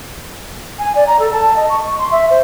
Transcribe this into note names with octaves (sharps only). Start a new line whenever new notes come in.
G#5
D5
A#5
A4
A5
D#5
C#6
C6
E5
C5